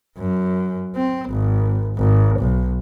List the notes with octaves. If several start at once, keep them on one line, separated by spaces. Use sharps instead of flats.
F#2
C4
G#1
G#1
B1